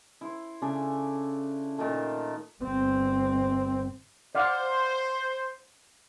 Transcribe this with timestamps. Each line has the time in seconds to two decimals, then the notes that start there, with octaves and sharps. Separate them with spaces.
0.21 E4 C5
0.62 C#3 D4 A4 E5
1.78 A#2 D#3 A3
2.61 G1 C4
4.35 C5 D5 F5 F#5